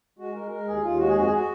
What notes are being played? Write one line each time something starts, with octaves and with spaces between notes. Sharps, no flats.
G#3 F#4
G#3 A#4
G#3 A#4
D#2 G#4
D#2 F4
G#3 F#4
G#4
F2 F#4
G#4
F#4